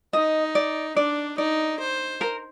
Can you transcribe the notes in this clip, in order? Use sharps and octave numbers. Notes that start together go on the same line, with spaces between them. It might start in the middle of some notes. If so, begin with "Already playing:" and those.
D#4 D#5
D5
D4 D5
D#4 D5
C5
A#4